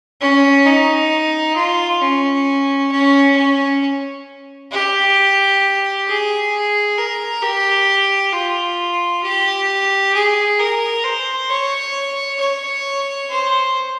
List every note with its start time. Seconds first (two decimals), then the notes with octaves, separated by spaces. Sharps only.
0.21 C#4
0.65 D#4
1.56 F4
2.01 C#4
2.91 C#4
3.36 C#4
4.72 G4
6.08 G#4
6.98 A#4
7.42 G4
8.33 F4
9.23 G4
10.14 G#4
10.59 A#4
11.04 C5
11.49 C#5
12.40 C#5
13.29 C5